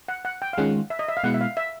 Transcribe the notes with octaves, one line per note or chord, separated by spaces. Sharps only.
F#5
F#5
G5
F5
D#3 G#3 C#4 F4 F#5
E5
D#5
E5
F5
B2 G#3 B3 E4 F#5
E5
F5
E5